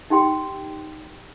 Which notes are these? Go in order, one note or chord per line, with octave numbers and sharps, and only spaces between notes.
D#4 G4 G5 C6